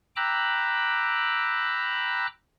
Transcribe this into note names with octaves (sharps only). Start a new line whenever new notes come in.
G5 A#5 B5 D6 E6 F#6